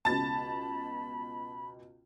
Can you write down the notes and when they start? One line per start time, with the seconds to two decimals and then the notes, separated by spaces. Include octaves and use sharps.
0.05 C#2 B2 A5 B5 A6